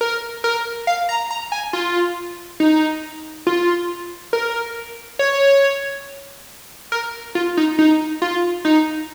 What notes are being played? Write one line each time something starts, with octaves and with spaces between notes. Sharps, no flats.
A#4
A#4
F5
A#5
A#5
G#5
F4
D#4
F4
A#4
C#5
A#4
F4
D#4
D#4
F4
D#4